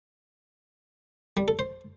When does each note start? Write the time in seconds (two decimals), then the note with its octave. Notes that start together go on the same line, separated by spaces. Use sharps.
1.37 G3
1.48 A4
1.59 C5